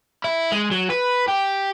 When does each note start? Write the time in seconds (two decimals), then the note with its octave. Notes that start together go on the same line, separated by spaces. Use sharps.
0.24 E4
0.52 G#3
0.71 F#3
0.90 B4
1.29 G4